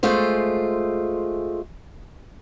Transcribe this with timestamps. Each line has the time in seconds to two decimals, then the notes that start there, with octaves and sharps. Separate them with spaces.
0.03 G#3 A3 F4 C5